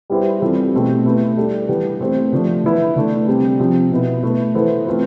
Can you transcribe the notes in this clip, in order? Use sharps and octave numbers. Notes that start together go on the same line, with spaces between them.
G3 B3 E4 G4 C5
E3 G3 C4 F4 A4
B2 A3 C4 G4
A3 E4 B4
G3 D4 A4
E3 G3 B3
A3 C4 G4 C5
D3 F3 A3 D4
E3 B3 E4 B4
D3 A3 D4
C3 G3 C4
C3 F3 C4
B2 B3 E4
A3 E4 B4
E3 B3 E4 A4 C5
A3 C4 F4 B4